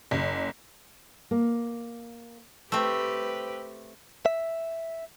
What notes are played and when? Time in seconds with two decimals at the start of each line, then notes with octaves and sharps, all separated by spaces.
0.11 F#1
1.31 A#3
2.72 A3 C4 G4 B4 C5 G5 E6
4.26 E5